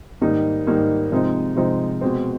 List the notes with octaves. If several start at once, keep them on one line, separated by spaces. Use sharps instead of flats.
G#2 D#3 G3 A#3 D#4
G#2 D#3 G3 A#3 D#4
C3 F3 G#3 C4 D#4
C3 F3 G#3 C4 D#4
B2 G#3 C4